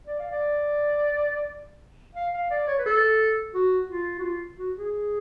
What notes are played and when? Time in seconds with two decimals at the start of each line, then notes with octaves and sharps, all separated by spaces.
0.07 D5
0.19 F5
0.31 D5
2.15 F5
2.33 F5
2.51 D5
2.68 C#5
2.79 B4
2.86 A4
3.55 F#4
3.90 F4
4.19 F#4
4.24 F4
4.59 F#4
4.77 G#4